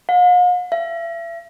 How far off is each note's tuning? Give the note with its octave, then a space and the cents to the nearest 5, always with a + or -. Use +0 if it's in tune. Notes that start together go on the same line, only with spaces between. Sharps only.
F5 +45
E5 +35